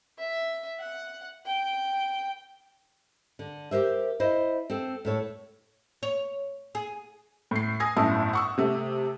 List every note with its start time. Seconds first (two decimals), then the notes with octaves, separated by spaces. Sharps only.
0.18 E5
0.79 F#5
1.46 G5
3.39 D3
3.71 G4 A#4 C5 E5
4.20 E4 C5 D#5
4.70 C4 A4
5.05 A2 A4 C#5
6.03 C#5
6.75 G#4
7.51 A2 C7
7.80 G#5 D#6 G#6 A#6
7.96 G1 F#2 A2 E4 A5 D#6
8.33 F#5 C#6 E6
8.58 C3 A3